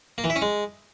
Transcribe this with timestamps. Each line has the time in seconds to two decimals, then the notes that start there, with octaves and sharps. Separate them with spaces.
0.18 A#3
0.24 E3
0.30 E4
0.36 C#4
0.42 G#3